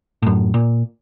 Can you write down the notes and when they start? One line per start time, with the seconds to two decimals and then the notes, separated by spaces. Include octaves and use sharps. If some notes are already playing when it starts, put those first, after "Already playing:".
0.22 F#2 A2
0.54 A#2